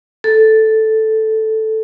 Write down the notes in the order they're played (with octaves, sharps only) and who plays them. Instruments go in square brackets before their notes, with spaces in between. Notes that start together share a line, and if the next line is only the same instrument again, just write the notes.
[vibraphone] A4